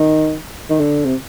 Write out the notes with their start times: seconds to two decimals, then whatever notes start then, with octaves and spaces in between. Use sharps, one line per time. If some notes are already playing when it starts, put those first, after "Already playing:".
Already playing: D#3
0.70 D#3
0.80 D3
1.05 C3